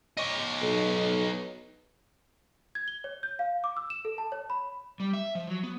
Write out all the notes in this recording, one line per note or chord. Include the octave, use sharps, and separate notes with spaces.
D#4 C#5
B1
G#6
G7
C#5
G6
F5
D6
E6
E7
A4
A5
C#5
B5
G3
E5
F3
F#3
B3